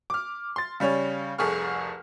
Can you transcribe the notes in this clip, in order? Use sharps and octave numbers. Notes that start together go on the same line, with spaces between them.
D6 F6
C6 A6
C#3 G3 C#4 C#5
F1 C2 G#4 A4 C#6 F6